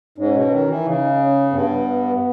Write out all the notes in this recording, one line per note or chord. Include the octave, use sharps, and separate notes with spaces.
G#2 C#4
B2
D#3
E3
C#3 D#4
C#4
G2 B3